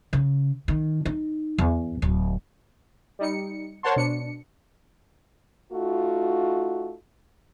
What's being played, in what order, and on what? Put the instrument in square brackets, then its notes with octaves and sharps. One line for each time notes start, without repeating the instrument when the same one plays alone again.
[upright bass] C#3
D#3
D#4
E2
D1
[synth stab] G3 D#4 C#7
A#4 C5 C#5 F#5 A5 C6
B2 D4 C#7
[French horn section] A3 D#4 F4 F#4